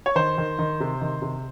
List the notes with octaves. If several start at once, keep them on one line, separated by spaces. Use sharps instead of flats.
C#5
D#3 C5
D#3
D#3
C3
D#3
C3